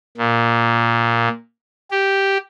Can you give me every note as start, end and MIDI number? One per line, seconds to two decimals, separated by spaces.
0.17 1.28 46
1.91 2.38 67